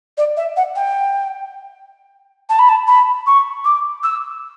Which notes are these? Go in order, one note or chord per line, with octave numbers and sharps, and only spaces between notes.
D5
E5
F#5
G5
A5
B5
A5
B5
C#6
D6
E6